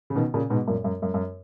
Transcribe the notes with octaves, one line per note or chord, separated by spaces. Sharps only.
C#3
B2 D#3
A#2 C#3
G#2 B2
F#2 A#2
F#2
F#2
F#2